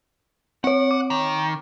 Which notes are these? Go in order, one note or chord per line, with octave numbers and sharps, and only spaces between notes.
C4 C#5 F#5
D6
D#3